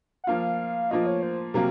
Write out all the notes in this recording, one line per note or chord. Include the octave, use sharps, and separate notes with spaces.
F#5
F3 A#3 F4 F5
F3 A#3 F4 D#5
C#5
C5
C3 F#3 A#3 A#4